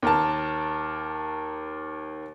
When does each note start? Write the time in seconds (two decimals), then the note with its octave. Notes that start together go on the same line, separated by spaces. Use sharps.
0.02 D#2 A#4 A5